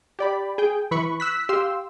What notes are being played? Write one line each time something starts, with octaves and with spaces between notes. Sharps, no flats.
G4 D5 B5
G#4 G5
E3 B4 B5 C#6
E6 F#6 B6
G4 F5 C6 E6